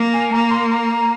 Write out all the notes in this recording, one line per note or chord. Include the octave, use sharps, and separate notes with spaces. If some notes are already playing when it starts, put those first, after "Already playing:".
Already playing: A#3
G#5
A#3 A#5
C6
A#5